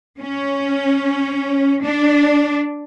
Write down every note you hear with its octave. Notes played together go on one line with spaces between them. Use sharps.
C#4
D4